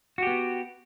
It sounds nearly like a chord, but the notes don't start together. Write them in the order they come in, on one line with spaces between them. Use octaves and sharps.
F#4 G4 B3